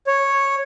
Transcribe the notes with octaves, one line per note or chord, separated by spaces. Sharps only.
C#5